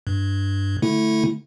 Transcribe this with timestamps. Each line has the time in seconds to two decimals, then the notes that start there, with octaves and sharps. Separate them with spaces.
0.07 G2
0.82 D3 A3 E4